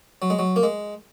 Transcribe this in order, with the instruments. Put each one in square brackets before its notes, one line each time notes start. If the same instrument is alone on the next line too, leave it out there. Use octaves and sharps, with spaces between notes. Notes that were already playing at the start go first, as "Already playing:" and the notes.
[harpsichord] F#3
G#3
F#3
A#3
G#3